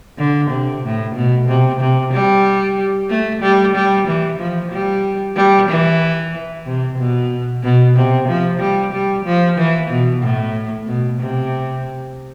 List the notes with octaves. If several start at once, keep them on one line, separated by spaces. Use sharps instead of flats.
D3
C3
A2
B2
C3
C3
G3
A3
G3
G3
E3
F3
G3
G3
E3
C3
B2
B2
C3
F3
G3
G3
F3
E3
B2
A2
B2
C3